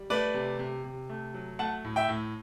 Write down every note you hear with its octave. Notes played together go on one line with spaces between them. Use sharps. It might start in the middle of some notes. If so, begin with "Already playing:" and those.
Already playing: G3
A3 B4 D5
C3
C3
C3
A3
F#3
A3 F#5 A5
A2
E5 G5
A2